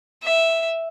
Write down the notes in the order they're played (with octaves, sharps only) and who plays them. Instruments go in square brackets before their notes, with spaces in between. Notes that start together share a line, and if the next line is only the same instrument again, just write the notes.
[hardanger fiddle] E5